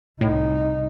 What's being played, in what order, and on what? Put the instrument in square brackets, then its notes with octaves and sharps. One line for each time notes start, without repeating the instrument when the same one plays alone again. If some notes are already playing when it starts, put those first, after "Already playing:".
[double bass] C2 D#4 [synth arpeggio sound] A2